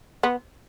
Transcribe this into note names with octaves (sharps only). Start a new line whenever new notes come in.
B3